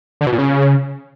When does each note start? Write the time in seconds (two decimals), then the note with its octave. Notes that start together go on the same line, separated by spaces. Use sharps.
0.21 D3
0.27 B2
0.32 A#2
0.38 C#3